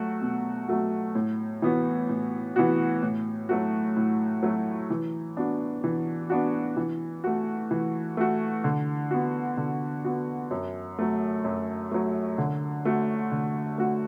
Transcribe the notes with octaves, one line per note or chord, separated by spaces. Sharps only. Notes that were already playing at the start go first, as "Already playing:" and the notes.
Already playing: F#3 A3 F#4
B2
F#3 A3 F#4
A2
E3 B3 F#4
A2
E3 B3 F#4
A2
F#3 A3 F#4
A2
F#3 A3 F#4
E3
B3 D4 F#4
E3
B3 D4 F#4
E3
A3 F#4
E3
A3 F#4
D3
B3 F#4
D3
B3 F#4
F#2
F#3 A3
F#2
F#3 A3
D3
A3 F#4
D3
A3 F#4